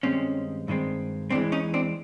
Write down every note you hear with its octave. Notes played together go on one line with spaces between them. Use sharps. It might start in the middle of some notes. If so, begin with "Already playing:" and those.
G2 D#3 G#3 C4 C#4
G2 D#3 G#3 C4
E2 C3 E3 G#3 C4 D4
C#4 D#4
C4 D4